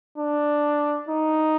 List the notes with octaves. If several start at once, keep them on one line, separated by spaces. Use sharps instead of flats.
D4
D#4